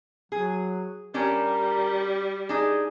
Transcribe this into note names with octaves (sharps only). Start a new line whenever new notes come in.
F#3 G#4
G3 C#4 D4 G4 A#4
D4 D#4 G#4